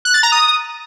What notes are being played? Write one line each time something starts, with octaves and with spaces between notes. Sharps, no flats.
F#6
A6
A#5
D#6